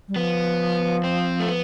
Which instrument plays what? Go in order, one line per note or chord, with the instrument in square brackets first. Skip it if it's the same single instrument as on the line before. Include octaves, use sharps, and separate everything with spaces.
[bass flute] G3
[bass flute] F3 [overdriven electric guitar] B3
[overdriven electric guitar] C4
A3
B3